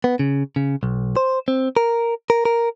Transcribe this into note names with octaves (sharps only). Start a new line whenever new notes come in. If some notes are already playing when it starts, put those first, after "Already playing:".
B3
C#3
C#3
B1
C5
C4
A#4
A#4
A#4